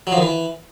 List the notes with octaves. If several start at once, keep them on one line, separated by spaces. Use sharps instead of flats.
F#3
F3
D#3
E3